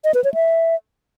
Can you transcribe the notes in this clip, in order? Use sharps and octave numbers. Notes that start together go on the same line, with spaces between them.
D#5
B4
C#5
E5